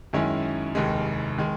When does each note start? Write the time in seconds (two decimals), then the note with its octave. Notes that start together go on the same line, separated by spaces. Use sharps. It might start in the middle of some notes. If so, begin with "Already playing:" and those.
0.13 F#2 D#3 G#3 C#4 E4
0.75 F1 D#2 D#3 G#3
1.38 D#3 G#3